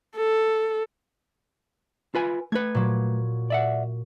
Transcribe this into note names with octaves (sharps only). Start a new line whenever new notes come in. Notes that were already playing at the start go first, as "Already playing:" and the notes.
A4
F4 B4 G#5
A3 B4 G#6
A#2 F#3
D5 E5 F#5